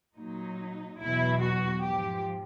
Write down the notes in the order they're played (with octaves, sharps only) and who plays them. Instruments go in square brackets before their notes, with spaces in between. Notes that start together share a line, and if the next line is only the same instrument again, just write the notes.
[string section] A#2 F#3 D#4
E2 B2 F#3 E4
F#4
G#2 F3 G4